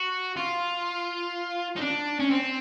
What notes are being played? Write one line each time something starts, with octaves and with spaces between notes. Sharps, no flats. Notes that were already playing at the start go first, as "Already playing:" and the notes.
Already playing: F#4
F4
D#4
D4
C#4
C4